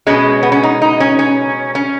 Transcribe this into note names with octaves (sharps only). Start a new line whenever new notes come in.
B2 G#3 C#4
B3
C#4
D#4
D#4
C#4
C#4
C#4